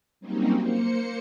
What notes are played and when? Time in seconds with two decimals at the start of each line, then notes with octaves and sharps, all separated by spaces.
0.21 F#3 G3 A#3 C4 C#4 D#4
0.57 A#3 C5 C#7